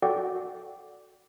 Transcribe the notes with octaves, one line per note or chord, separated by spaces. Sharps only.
F#4 A4 D5 F#5 G5 D6